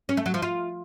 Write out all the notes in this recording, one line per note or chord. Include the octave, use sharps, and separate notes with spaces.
C#4
A3
F#3
F3
F4